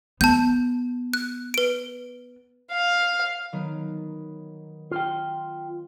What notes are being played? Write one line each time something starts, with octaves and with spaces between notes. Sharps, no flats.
B3 A5 G6
F#6
B4 D7
F5
D#3 F#3 B3
F4 G5